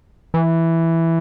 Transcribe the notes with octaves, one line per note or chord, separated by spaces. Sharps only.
E3